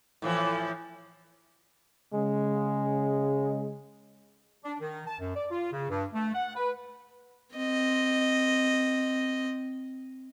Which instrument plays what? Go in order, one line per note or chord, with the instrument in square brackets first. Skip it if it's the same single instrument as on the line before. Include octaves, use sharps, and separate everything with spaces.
[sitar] A2 E3 F3
[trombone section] C#3 G#3
[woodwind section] D4
D#3
A5
F#2
D5
F4
C#3
G2
A3
F#5
B4
[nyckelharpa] C4 D#5